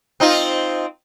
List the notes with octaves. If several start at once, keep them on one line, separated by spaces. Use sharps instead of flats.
C4 D#4 F4